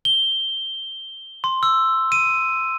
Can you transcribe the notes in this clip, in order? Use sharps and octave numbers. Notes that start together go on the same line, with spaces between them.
G7
C6
E6
D#7